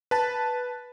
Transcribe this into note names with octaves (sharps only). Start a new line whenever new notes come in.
B4 A5